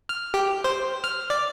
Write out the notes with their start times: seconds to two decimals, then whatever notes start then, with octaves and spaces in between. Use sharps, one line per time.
0.09 F6
0.34 G4
0.64 C5
1.04 F6
1.30 D5